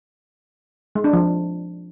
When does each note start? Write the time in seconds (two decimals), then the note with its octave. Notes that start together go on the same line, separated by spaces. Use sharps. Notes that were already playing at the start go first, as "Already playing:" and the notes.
0.95 G#3
1.04 D4
1.13 F3